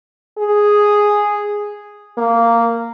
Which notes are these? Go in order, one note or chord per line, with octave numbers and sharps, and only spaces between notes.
G#4
A#3